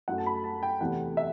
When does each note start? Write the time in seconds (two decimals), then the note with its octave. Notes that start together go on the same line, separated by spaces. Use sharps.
0.08 F#2 F#3 A3 F#5
0.18 A5
0.26 B5
0.44 A5
0.63 G5
0.80 E2 C3 E3 A3 F#5
1.17 E5